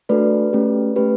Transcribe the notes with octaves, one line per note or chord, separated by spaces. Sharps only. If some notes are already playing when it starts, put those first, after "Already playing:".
A3 D4 F#4 A4 B4 D5
A3 C#4 G4
A3 C#4 G4 B4